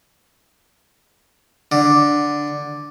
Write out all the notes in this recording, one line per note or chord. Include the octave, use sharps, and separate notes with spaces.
D3